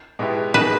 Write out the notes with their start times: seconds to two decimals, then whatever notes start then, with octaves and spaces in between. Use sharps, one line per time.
0.19 B2 G#3 B3 E4 G4
0.54 B2 A#3 D#4 G#4 B4